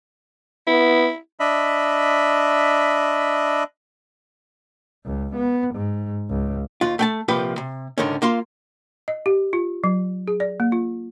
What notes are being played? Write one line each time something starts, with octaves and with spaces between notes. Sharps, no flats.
B3 E4
D4 D#5 E5 B5
C#2
B3
G#2
C#2
D#2 F4
A3 G5 A5
C2 A#2 F3 G4 B4
C3
C#2 G#2 D3 D#3 C#4
A#3 F4 F5 C6
D#5
G4
F4
F#3
G#4
D5
A#3
F4